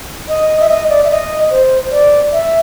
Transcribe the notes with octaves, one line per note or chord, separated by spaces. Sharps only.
D#5
E5
D#5
D5
E5
D#5
C5
D5
E5